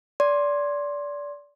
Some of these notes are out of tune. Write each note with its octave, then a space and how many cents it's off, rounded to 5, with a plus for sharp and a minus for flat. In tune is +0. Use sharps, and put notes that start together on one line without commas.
D5 -20 C6 +15